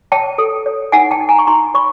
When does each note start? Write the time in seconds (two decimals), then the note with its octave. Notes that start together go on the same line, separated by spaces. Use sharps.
0.12 C#5 G5 A5
0.38 A4
0.66 C#5
0.92 D#4 F#5 G#5
1.11 G5 A5
1.21 D#4
1.29 G#5 A#5
1.39 C#6
1.47 D#4 A#5 C6
1.74 C#5 B5 C#6